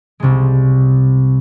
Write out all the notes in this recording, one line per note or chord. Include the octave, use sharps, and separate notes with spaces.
C2 C3 G#3